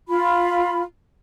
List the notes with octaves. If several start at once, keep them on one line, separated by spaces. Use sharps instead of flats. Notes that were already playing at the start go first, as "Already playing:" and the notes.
F4 B5